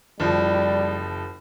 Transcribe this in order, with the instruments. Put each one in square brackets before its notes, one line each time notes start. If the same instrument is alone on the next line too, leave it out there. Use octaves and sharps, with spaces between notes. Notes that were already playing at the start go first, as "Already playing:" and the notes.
[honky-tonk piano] F#1 F3 [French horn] G3